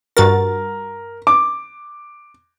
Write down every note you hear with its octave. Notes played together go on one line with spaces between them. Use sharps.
G2 F#4 A#4 A6
D6